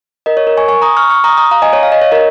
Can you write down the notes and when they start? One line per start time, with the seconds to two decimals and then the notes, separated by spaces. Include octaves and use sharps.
0.26 A#4 D#5
0.37 C#5
0.47 A#4
0.57 G#5 C#6
0.68 G#5 C#6
0.82 A#5 D#6
0.97 C#6 F6
1.09 C#6 F6
1.24 A#5 D#6
1.37 A#5 D#6
1.51 F5 A#5
1.62 D#5 G#5
1.73 C#5
1.83 F5
1.92 D#5
2.02 C#5
2.12 A#4 D#5